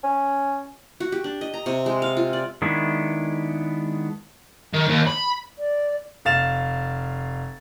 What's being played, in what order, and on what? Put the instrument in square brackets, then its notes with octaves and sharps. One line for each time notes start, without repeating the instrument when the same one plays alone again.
[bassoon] C#4
[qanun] F#4
G4
D4
D#5
A#5
C3
G#3
F5
F4
D5
[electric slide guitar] D#3 G#3 B3 D4 E4
[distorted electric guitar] D#3
D#2
B5
[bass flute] D5
[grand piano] F1 F5 A6 E7 F7